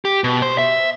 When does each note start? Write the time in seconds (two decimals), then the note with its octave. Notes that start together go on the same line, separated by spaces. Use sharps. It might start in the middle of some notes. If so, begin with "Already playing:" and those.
0.05 G4
0.24 B2
0.42 C5
0.58 E5